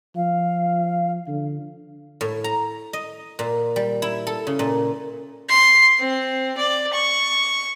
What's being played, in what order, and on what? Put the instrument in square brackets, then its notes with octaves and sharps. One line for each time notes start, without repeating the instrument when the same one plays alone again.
[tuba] F3 [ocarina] F5
[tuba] D3
[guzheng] A2
A#5
D#5
A#2
G3
E4
A4
C#3
A#2
[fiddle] C6
C4
D5
C#6